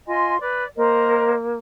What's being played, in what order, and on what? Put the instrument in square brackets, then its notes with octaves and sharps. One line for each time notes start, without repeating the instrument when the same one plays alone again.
[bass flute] F4 [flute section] D#5 G#5 C6
[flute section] B4 [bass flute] D5
[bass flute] A#3 [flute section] A#4 C5 D#5